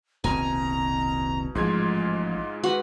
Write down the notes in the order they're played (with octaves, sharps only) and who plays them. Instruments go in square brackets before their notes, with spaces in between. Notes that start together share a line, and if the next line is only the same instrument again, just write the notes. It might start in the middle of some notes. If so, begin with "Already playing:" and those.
[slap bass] D#1 C2 C4 [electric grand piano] B2 [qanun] G#5 [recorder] A#5
[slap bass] A1 F3 [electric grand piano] G#2 G#3 G#6 [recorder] F4
[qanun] F#4 [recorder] B4